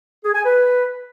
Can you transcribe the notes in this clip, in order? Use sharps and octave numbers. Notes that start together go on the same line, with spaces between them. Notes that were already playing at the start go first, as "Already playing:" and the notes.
G#4
G#5
B4